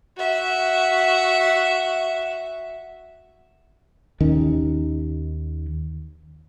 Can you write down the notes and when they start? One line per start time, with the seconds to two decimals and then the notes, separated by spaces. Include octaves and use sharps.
0.17 F#4 E5
4.20 D#2 D#3 C#4